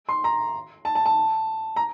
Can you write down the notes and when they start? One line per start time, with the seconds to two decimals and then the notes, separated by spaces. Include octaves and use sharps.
0.09 C6
0.24 A#5
0.85 A5
0.95 A5
1.06 A5
1.76 A#5